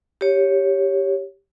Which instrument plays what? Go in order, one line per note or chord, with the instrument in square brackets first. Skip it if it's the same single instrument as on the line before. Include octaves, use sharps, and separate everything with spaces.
[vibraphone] G4 C#5